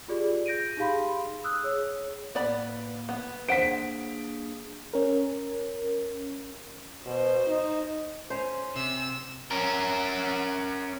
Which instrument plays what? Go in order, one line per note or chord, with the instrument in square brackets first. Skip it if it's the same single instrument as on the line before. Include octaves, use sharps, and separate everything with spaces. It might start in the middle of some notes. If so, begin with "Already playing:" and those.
[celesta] F4 G4 G#4 D5
G6 A#6 D7 D#7
D#4 G4 G#4 F5 B5 C6
D#6 E6 F#6
G#4 C#5
[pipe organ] A2 A#3 [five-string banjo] B3 D5 B5
[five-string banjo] B3
[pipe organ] A#3 D4 G#4 [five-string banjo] C5 F#5 [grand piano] B6 D7
[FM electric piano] C#4 A#4
[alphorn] B2 [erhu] C5
[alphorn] D#4
[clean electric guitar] C#4 [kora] C5
[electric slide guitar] C3 [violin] E6
[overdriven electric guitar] C#4 A#4